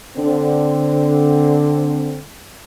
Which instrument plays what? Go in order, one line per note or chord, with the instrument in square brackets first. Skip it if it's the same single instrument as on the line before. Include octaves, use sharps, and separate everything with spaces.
[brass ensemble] D3 C4